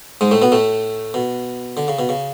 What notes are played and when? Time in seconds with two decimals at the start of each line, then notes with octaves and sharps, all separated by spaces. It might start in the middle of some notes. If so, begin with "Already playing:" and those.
0.21 G#2 G#3
0.31 A2 A3
0.42 B2 B3
0.52 A2 A3
1.14 B2
1.77 D3
1.88 C#3
1.99 B2
2.09 C#3